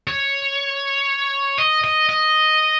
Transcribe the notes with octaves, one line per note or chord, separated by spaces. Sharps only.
C#5
D#5
D#5
D#5